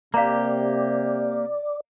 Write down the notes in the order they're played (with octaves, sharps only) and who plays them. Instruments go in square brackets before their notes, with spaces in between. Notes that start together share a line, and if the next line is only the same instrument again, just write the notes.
[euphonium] C3 [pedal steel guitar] A#3 G4 [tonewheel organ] D5 [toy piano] F5 A#5